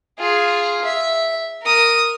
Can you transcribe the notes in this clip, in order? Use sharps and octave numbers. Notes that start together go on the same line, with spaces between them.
F4 G#4
E5
A#4 D#6